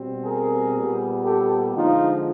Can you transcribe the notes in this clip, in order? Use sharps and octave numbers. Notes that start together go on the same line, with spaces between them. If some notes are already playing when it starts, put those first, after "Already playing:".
Already playing: B2 G3 C4
G#4 A#4
A#2 G3 B3
G4 A4
D3 F3 G#3 D#4 F4